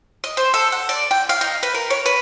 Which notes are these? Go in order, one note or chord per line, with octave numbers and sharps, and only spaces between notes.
D#5
C5
A4
F#5
D5
G5
F5
D#4
B4
A#4
C#5
B4